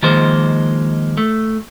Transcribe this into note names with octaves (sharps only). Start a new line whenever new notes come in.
D#3 F3 G#3 A#3 C5
A3